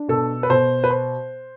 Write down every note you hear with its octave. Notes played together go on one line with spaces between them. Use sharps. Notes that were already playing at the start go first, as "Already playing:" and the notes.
Already playing: D4
B2 A4
B4
B2 C5
B4
C5